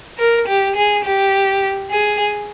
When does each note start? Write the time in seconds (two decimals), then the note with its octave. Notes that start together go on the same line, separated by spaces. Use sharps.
0.18 A#4
0.47 G4
0.76 G#4
1.04 G4
1.91 G#4